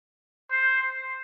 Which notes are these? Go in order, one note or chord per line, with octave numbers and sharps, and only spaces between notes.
C5